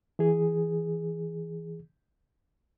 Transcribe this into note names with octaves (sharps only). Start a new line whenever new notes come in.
E3 G#4